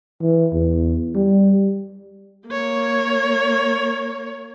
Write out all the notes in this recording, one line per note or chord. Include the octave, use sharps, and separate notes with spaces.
E3
E2
G3
A#3 C#5